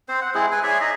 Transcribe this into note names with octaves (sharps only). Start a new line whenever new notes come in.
C4 C5
F#5
G#3 C4 E4 G#4
B4 G#5
G#4 C#5 D5 E5
D#4 G#4 D#5